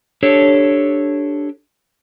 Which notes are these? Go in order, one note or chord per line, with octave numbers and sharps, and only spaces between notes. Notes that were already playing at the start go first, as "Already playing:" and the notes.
D4 G4 A4 C#5